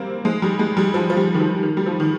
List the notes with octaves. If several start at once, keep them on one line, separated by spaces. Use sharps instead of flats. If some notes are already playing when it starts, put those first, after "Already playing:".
Already playing: G3 A#3 C4
G#3
G3
G#3
G3
F3
F3
G3
D#3
F3
D#3
G3
F3
D#3